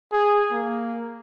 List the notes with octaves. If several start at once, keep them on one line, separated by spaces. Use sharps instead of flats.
G#4
A#3